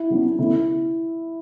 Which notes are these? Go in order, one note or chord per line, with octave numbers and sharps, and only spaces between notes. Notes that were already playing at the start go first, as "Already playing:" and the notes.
Already playing: E4
C#3 F#3 B3 D4
C#2 B2 A3 C#4 E4